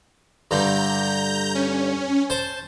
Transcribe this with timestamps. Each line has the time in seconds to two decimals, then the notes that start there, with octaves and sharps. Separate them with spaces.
0.51 G2 D3 A#5 G6
1.55 C#4
2.30 C5 A5